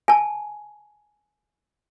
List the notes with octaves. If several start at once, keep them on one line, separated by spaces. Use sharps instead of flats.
G#5 A5